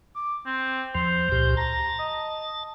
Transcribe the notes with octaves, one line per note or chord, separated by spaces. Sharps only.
D6
C4
E2 F3 C5
C#2 A#2 G4
A5 A#5
D#5